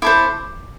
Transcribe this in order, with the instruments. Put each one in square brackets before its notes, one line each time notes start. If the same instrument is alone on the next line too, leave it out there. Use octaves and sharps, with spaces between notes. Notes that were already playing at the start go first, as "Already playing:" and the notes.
[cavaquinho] E4 A4 C5 D6